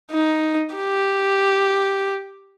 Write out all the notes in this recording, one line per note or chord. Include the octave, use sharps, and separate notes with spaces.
D#4
G4